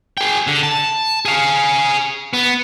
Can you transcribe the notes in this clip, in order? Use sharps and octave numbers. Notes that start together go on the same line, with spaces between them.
G#4 G5
D3
A5
G#4 F5
B3